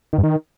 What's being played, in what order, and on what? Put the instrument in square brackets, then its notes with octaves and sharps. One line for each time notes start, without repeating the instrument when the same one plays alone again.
[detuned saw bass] D#3
G2
D#3